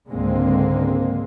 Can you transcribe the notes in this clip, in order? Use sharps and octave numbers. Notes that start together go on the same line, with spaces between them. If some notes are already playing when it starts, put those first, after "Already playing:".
C#2 G#2 D3 G#3 A#3 C4